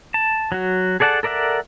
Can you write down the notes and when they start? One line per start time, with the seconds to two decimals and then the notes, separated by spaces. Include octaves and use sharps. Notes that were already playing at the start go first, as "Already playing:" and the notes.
0.14 A5
0.52 F#3 F#4
1.00 G#4 A4 D5 F#5 A5
1.23 A4 A#4 D5 E5 F#5